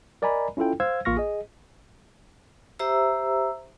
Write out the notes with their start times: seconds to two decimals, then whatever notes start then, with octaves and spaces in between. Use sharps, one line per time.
0.22 A#4 D5 D#5 G#5 A#5 B5
0.57 C#4 E4 F4 A4 G5
0.80 C5 F5 E6 G#6
1.05 A1 A#3 F4 C#6 F6 A#6
1.17 G#4 D#5
2.79 G4 C5 E5 A#5 E6